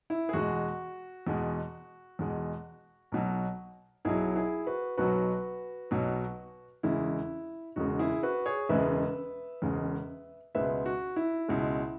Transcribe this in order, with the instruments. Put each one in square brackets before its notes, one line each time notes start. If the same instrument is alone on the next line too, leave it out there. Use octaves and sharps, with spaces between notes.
[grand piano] E4
G#4
E2 B2 G#3 F#4
E2 B2 G#3
E2 B2 G#3
B1 B2 F#3
B1 B2 F#3 E4 G#4
E4 G#4
F#4 B4
B1 B2 F#3 F#4 B4
B1 B2 F#3
E1 E2 C#3 G#3 E4
E1 E2 C#3 G#3 F#4
E4 G#4
F#4 B4
G#4 C#5
E1 E2 C#3 G#3 B4 E5
E1 E2 C#3 G#3
C#2 B2 G#3 B4 E5
F#4
E4
C#2 B2 G#3